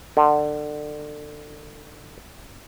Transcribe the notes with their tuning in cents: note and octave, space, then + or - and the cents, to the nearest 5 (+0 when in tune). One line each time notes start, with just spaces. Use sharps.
D3 +25